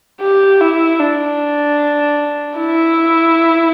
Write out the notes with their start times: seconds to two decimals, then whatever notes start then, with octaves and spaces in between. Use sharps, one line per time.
0.21 G4
0.61 E4
1.00 D4
2.58 E4